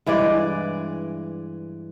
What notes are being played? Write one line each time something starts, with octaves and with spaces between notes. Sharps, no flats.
G2 E3 G#3 D5